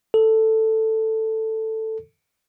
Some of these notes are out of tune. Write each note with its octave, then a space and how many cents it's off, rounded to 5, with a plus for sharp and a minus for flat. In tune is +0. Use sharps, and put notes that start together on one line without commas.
A4 +5